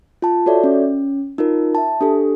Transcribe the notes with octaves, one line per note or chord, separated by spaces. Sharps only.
F4 A5
F#4 A4 C#5 D5 E5
C#4
D#4 F4 A#4
E5 A5
D4 G4 A4